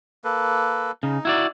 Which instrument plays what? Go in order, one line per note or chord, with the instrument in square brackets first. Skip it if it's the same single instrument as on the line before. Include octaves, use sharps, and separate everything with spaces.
[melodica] A#3 A4 B4
[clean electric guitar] C#3 [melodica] D#4
[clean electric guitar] E4 F#4 D5